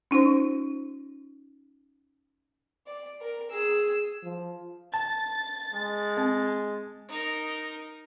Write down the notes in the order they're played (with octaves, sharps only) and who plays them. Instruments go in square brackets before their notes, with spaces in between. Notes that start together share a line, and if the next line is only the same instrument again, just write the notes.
[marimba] C#4 D#4 F4 C5
[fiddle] D5
A#4
G#4 E6
[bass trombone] F3
[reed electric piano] A5 [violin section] A6
[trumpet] G#3
[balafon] C4
[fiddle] D#4 A#4